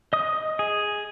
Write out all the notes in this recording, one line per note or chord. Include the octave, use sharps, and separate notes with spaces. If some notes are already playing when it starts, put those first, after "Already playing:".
D#5 D#6
G#4